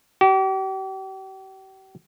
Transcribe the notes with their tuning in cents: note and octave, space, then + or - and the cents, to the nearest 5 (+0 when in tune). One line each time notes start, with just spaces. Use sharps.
G4 -40